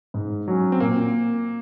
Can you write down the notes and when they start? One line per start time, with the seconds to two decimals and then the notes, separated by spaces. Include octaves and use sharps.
0.14 G#2
0.48 F#3 C#4
0.72 C4
0.80 A#2 A#3